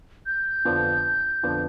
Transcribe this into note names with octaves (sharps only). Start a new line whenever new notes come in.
G6
F2 D3 F3 B3 D4
F2 D3 F3 B3 D4